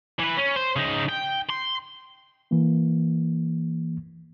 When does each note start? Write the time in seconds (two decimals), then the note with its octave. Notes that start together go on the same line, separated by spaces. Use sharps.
0.19 E3 B4
0.37 C#4
0.56 C5
0.76 C#3 D#4
1.09 G5
1.50 C6
2.51 E3 A#3